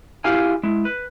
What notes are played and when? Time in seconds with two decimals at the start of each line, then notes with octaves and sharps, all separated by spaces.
0.24 E4 F4 G4 F5 G#5
0.63 G#3 E4
0.85 B4